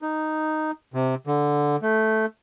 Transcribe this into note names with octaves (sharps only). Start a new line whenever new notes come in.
D#4
C3
D3
A3